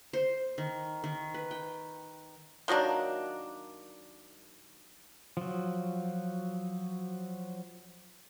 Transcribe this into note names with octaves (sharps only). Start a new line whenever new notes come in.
C5
D#3
D#3
B4
G5
D#3 F#3 A#3 D4
F3 F#3